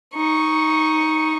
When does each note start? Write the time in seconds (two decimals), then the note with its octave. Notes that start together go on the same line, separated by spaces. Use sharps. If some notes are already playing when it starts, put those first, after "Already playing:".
0.16 D#4 C#6